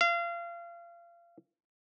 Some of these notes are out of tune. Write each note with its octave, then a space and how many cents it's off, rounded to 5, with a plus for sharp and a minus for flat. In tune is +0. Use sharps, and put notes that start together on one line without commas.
F5 -30